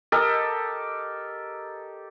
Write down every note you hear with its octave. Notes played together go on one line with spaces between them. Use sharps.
G4 A4 A#4 D#5